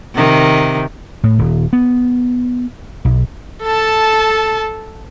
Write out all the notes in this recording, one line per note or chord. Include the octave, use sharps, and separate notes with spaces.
C3 D#3
A2
D#1
B3
B1
A4 A5